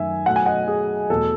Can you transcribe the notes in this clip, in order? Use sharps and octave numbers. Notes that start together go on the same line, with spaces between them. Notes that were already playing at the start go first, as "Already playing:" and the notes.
Already playing: F#2 D#3 A3 E5 G#5
B2 F#3 A3 F#5
G#5
D#5 F#5
G#4
E2 B2 A3 A4